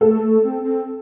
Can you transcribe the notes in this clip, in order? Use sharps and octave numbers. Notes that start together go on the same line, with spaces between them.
A3 A4
A3
C4
C4